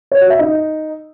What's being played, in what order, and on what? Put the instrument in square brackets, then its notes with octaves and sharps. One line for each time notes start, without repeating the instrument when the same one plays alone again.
[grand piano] C#5
F#4
E5
D#4